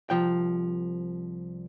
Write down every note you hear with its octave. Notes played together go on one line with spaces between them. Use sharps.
C2 F3 G5